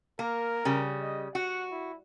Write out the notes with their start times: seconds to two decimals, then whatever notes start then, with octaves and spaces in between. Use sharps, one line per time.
0.19 A#3 A#4
0.65 C#3 G3
1.02 D#5
1.35 F#4 F#5
1.71 E4